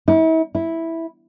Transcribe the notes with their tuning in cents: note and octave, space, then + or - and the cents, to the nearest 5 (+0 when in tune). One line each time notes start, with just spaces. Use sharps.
E4 -40
E4 -5